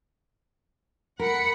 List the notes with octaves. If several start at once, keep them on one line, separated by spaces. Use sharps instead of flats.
A#4 F#5 B5 C#7